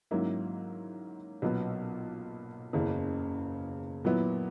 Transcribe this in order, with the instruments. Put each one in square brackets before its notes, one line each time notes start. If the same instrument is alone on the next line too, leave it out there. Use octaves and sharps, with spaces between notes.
[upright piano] G#2 F#3 A#3 C#4 E4
B1 A#2 F#3 B3
F#1 E2 C#3
A#2 F#3 B3 E4